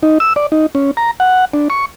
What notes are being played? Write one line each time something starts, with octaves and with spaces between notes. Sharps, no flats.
D#4
E6
D5
D#4
C#4
A#5
F#5
D4
C#6